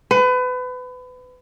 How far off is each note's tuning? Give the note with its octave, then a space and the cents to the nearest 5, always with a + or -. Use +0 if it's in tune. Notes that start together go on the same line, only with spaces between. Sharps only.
B4 +30